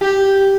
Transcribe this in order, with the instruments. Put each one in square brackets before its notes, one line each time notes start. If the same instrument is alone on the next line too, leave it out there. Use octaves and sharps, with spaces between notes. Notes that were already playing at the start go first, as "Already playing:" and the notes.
[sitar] G4